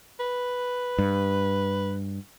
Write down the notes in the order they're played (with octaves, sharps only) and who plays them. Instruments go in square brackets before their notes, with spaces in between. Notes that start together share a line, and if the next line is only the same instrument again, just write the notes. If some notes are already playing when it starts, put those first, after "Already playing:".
[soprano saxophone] B4
[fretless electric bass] G2